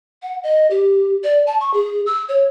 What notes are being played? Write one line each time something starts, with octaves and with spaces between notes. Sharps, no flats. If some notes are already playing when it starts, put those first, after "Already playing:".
F#5
D#5
G4
D5
A5
C#6
G#4
E6
C#5